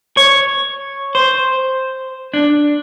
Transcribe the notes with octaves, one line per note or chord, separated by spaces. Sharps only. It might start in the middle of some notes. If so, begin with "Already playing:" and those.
C#5
C5
D4